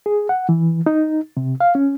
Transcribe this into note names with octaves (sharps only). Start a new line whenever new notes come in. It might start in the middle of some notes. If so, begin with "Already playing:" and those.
G#4
F#5
E3
D#4
C3
F5
C#4